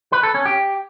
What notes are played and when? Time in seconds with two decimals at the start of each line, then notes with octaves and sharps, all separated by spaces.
0.12 B4
0.23 A4
0.34 C#4
0.46 G4